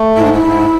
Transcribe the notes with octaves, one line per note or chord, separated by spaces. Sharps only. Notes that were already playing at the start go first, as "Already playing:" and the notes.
Already playing: A3
G#2 E4
D4
E4
G#2